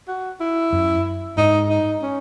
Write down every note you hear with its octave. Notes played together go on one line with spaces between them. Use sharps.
F#4
E4
F#2
G#2 D#4
D#4
C#4